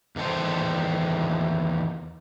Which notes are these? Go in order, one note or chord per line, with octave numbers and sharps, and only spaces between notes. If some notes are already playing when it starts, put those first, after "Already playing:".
E2 D#3 A4 C5